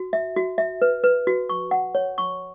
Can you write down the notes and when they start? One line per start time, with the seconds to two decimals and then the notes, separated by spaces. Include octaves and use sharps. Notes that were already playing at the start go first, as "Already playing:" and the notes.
Already playing: F#4
0.13 E5
0.37 F#4
0.58 E5
0.82 B4
1.04 B4
1.27 F#4
1.49 C#6
1.71 F#5
1.95 C#5
2.18 C#6